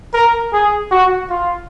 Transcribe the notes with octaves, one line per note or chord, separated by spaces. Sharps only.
A#4
G#4
F#4
F4